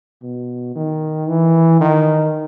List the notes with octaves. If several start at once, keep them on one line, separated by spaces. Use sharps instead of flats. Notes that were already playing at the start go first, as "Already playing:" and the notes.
B2
D#3
E3
D#3